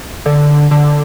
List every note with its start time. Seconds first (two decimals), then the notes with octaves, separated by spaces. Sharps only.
0.26 D3
0.71 D3